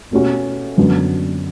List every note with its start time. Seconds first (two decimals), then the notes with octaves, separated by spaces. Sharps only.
0.11 B2 A3 C#4 F#4
0.77 F#2 D3 F#3 B3